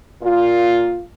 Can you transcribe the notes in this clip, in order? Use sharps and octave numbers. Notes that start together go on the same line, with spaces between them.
A#2 F4